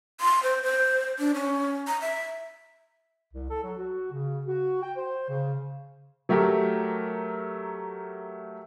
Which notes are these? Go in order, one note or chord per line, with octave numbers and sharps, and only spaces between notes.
C6
C5
C5
D4
C#4
A#5
E5
C2
A4
F#3
F#4
C#3
F#4
G5
C5
C#3
F#3 A3 G4 A#4